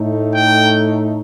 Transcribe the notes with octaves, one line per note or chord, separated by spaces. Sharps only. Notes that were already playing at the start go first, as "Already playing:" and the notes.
Already playing: A2 A3 D#4
G5